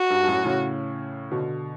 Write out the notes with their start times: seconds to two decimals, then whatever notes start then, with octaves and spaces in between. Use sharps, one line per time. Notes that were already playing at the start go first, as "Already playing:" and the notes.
Already playing: F#4
0.10 G2
0.23 G2
0.27 F#2 A2
0.45 A2 C#3
1.31 B2 D3